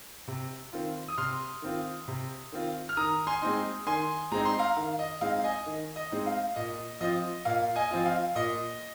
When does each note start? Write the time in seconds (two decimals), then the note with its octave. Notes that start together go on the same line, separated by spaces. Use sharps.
0.28 C3
0.73 D#3 C4 F4
1.08 D#6
1.17 C3 C6 F6
1.62 D#3 C4 F4
2.08 C3
2.52 D#3 C4 F4
2.89 F6
2.97 D#3 A#5 D#6
3.27 G#5 C6
3.42 G#3 C4 D#4
3.87 D#3 G#5 C6
4.32 G#3 C4 D#4 A#5
4.45 C6
4.59 F5 A#5
4.77 D#3 F5
4.99 D#5
5.21 G#3 C4 D#4 F5
5.44 D#5 G#5
5.66 D#3
5.96 D#5
6.11 G#3 C4 D#4
6.26 F5
6.56 A#2 D#5
7.01 F3 C4 F4 D#5
7.45 A#2 F5
7.76 D#5 G#5
7.91 F3 C4 F4
8.06 F5
8.35 A#2 D#5